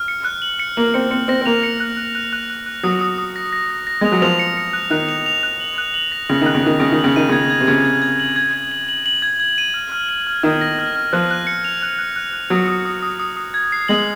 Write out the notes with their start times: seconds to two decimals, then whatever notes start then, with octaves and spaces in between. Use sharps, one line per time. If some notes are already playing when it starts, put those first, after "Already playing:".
Already playing: F6
0.08 C#7
0.24 F#6
0.42 F#7
0.60 C#7
0.77 A#3 F#7
0.94 C4 C#7
1.11 C4 C#7
1.28 C4 A#6
1.41 C4
1.46 A#3 F7
1.64 C#7
1.80 F#6
1.97 F#6
2.15 F#6
2.33 F#6
2.50 F#6
2.66 F#6
2.83 F#3 D#6
3.01 D#6
3.18 D#6
3.36 A#6
3.53 A#6
3.70 A#6
3.87 A#6
4.01 G#3 F7
4.12 F#3
4.22 F3 F7
4.39 C#7
4.57 C#7
4.73 F#6
4.90 D#3 F#6
5.09 F7
5.26 F7
5.43 F#6
5.60 F#7
5.78 F#6
5.94 F#7
6.12 A#6
6.29 C#3 A#6
6.41 D#3 F#6
6.55 C#3
6.63 D#3 F#6
6.80 C#3 A#6
6.92 D#3
6.99 F#7
7.04 C#3
7.16 D#3 D#7
7.29 C#3 G#6
7.50 G#6
7.61 C3
7.67 C#3 G#6
7.85 G#6
8.02 G#6
8.20 F#7
8.36 G#6
8.53 G#6
8.72 F#7
8.89 F#7
9.06 F#7
9.22 G#6
9.40 G#6
9.58 D#7
9.74 F6
9.92 F6
10.09 D#7
10.27 F6
10.43 D#3 F6
10.61 A#6
10.79 F6
10.96 F6
11.13 F3 F#6
11.31 F#6
11.47 C#7
11.64 F7
11.82 F#6
11.99 F#6
12.16 F#6
12.33 F#6
12.50 F#3 D#6
12.68 D#6
12.85 D#6
13.03 D#6
13.20 D#6
13.37 D#6
13.54 G#6
13.72 C7
13.88 G#3 F#7